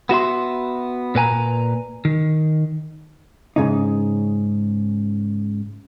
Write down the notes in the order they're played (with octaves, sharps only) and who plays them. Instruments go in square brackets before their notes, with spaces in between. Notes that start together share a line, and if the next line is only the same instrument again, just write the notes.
[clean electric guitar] B3 F#4 E5 C6
A#2 B4 G#5 A#5
D#3
[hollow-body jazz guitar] G#2 C#3 D#4